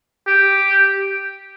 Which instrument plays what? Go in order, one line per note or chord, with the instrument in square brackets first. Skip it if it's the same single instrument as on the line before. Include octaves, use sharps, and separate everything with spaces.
[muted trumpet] G4